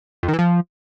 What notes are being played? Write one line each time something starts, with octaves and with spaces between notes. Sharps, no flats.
F2
D#3
E3
F3